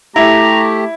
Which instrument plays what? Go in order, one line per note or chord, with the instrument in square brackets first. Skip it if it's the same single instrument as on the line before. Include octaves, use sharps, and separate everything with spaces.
[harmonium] A3 G4 [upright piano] E4 [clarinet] A#5